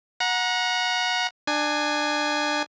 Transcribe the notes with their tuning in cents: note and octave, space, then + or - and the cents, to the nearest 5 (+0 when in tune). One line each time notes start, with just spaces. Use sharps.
F#5 -20 A#5 +25
D4 +25 G#5 +0